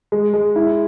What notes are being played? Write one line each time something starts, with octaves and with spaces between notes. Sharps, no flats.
G#3
G#3
E4